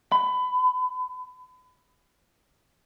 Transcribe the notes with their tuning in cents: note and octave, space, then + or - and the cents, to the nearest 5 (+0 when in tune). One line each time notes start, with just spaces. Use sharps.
B5 +25